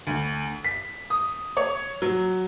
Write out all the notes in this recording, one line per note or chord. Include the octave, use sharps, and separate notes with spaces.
D2
B6
D#6
C#5
F#3